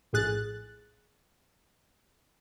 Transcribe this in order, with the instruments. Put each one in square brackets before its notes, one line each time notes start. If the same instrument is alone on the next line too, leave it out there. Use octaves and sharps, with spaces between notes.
[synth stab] A#1 A2 G#4 F#6 A6